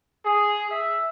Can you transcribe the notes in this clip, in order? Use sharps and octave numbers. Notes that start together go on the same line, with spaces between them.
G#4
E5